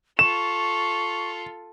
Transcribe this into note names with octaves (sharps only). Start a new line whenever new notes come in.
F4 A4 C#6 E7